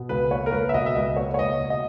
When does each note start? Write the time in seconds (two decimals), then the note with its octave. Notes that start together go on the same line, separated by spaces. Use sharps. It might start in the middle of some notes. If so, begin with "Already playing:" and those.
Already playing: B2
0.09 C#2 B4
0.31 A#3 C#5
0.46 A#4
0.52 C#2 B4
0.69 E5
0.74 B2 D#5
0.86 E5
0.96 C#2 D#5
1.16 A#3 C#5
1.34 C#5
1.39 C#2 D#5
1.60 B2
1.70 D#5